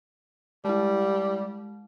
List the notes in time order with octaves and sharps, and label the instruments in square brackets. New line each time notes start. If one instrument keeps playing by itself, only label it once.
[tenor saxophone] G3 [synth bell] G#3 E4